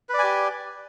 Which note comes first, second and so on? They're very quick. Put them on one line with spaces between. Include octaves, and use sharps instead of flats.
B4 D5 G#5 G4